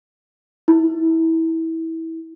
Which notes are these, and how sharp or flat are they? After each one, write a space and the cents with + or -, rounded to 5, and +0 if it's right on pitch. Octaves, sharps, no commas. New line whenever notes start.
E4 -20